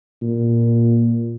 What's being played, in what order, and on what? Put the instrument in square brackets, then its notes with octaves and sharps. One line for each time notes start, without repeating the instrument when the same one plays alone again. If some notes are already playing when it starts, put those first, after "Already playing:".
[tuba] A#2